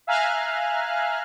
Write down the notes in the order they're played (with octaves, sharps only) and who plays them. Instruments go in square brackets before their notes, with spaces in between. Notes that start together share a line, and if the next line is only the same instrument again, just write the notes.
[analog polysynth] E5 F5 G#5 A#5 F6 F#6